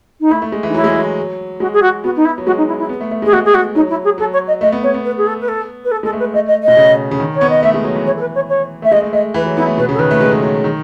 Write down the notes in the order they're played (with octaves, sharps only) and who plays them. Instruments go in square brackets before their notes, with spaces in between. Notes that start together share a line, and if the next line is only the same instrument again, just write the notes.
[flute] D#4
[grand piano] A3 [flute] E4
[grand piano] A3
G#3
E3
[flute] D#4
[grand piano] F#3 [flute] E4
[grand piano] G#3
F#3
[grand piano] G#3 [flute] F#4
[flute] G#4
F#4
[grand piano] B3 [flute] F#4
[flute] D#4
E4
[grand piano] F#3
[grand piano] G#3 [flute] F#4
[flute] D#4
E4
E4
[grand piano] B3
A3
A3
[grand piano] G#3 [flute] G#4
[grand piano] G#3 [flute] F#4
[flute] G#4
F#4
[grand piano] F#3 [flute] D#4
[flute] E4
G#4
[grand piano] F#3 [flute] A4
[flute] C#5
D#5
[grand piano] A3 [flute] D#5
[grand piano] B3
[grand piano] B3 [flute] C#5
[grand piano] B3
[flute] B4
G#4
A4
B4
A4
B4
A4
[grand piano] G#3 [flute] A4
[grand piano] A3
[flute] B4
[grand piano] A3 [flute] D#5
[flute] D#5
D#5
[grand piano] B2
C#3
C#3
D#3
[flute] C#5
[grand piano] B3
[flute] D#5
[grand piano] A3 [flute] E5
[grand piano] G#3
F#3
E3
[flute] C#5
A4
B4
C#5
C#5
[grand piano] A3 [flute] E5
[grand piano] G#3 [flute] D#5
[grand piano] A3
[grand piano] A3 [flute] D#5
[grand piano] E3 [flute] B4
[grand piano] F#3
[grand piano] B3 [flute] E4
[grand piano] A3
[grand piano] B2 [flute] B4
[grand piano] C#3
[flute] A4
[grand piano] D#3 [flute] B4
[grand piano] A3
G#3
F#3
F#3
D#3